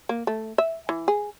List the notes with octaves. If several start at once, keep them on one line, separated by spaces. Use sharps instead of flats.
A#3
A3
E5
E3
G#4